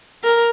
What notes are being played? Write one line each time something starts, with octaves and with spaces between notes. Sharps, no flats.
A#4